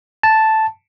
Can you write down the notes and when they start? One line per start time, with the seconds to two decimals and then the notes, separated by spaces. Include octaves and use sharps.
0.23 A5